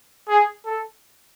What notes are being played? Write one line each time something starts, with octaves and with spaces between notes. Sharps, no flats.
G#4
A4